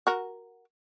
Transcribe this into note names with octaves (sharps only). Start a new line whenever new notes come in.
F#4 A#4